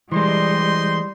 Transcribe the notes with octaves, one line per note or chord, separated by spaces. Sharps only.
E3 G3 G#3 C5 D#5 C6